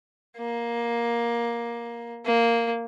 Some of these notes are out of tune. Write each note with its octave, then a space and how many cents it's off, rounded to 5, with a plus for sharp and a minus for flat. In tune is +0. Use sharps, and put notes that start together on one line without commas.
A#3 +15
A#3 -5